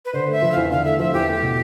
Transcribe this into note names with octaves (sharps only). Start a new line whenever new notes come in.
B4
D3 C5
A3 E5
F3
E2 F5
D3 F5
A3 E5
F3 E5
E2 G4
A3
B2